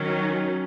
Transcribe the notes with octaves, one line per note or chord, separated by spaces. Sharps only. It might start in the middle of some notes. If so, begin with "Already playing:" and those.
Already playing: D#3 F#3 C#4